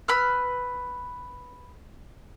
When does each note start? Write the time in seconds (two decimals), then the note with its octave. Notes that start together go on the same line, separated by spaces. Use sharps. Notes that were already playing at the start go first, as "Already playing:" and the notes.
0.08 B4 B5 E6 F6